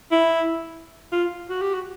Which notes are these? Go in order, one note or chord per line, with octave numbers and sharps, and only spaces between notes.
E4
F4
F#4
G4
F#4